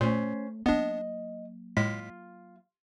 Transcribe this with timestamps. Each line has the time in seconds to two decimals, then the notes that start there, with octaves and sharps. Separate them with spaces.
0.01 A#2 A3 C#4 C5
0.66 F#3 A#3 B3 D4 D#5
1.77 A2 G#3 F4 B6